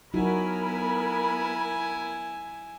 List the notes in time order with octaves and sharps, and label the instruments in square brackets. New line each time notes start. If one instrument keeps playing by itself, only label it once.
[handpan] F#3 D#4 F#4 [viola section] B3 A#4 B5 [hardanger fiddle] E4 G#5